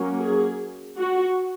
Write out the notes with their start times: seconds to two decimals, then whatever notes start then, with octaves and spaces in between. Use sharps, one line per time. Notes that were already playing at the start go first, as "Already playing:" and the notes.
Already playing: F#3 A#3 C#4
0.20 G#4
0.98 F#4